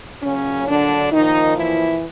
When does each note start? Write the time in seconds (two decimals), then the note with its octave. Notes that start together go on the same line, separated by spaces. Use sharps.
0.23 A#2 C#3 F#3 C#4
0.68 D3 D4
1.12 A#2 D#3 F3 D#4
1.57 E3 E4